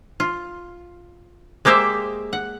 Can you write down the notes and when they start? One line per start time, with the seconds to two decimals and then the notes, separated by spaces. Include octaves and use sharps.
0.20 F4
1.65 G#3 A#3 G4 C5 E5
2.33 F#5